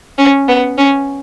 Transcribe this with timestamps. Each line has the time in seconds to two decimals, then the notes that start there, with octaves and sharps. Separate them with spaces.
0.18 C#4
0.49 B3
0.78 C#4